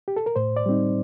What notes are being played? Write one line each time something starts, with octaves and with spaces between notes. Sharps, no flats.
G4
A4
A#4
A2 C5
D5
G3 C4 D#4